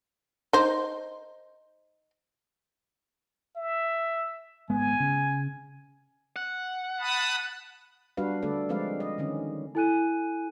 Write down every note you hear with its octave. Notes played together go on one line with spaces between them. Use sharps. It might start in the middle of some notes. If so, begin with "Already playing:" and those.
D#4 C5
E5
G#1 G#3 B3 G#5
C#3
F#5
A5 B5 D#6
G3 D4 F#4 B4 F5
D3 A3 D4 A4 D5
F3 G#3 C4 B4 D5 F5
D#5
D3 D#3 C#4
E4 A4 G#5 F#6 D#7